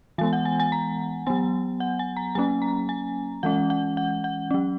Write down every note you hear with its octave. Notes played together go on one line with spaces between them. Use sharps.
E3 G#3 B3 G#5
F#5
G#5
G#5
A#5
F#3 B3 G#5
F#5
G#5
A#5
F#3 A#3 C#4 G#5
A#5
G#5
E3 G#3 C#4 F#5
F#5
F#5
F#5
F#3 C#4